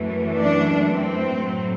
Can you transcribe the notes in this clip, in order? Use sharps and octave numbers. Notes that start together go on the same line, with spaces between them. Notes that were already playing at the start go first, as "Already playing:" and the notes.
Already playing: F#2 E3 A3
D4
C4
A2 F#3 A3